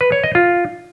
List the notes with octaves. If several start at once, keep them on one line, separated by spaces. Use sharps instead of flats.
B4
C#5
D#5
F4